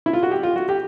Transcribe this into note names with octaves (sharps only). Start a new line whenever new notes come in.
E4
F4
F#4
G4
F4
F#4
G4